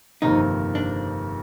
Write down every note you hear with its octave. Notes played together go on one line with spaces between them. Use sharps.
G1 F2 C3 D#3 A#3 D#4
D4